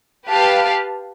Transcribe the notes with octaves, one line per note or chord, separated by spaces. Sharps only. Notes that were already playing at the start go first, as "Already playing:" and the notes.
G4 B4 F5 A5